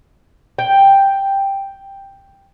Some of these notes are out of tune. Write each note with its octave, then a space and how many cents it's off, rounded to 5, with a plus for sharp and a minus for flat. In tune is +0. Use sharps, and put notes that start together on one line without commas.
G5 +5